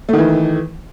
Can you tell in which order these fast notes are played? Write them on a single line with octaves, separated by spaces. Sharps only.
A3 D#3 E3